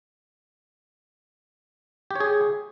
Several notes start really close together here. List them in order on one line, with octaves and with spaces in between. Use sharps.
G4 C#5 G#4